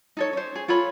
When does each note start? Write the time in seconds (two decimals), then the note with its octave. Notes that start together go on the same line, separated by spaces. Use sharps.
0.17 D#4 A4 C#5
0.33 C#4 C5
0.55 G#4
0.68 F4 A4 C#5 B5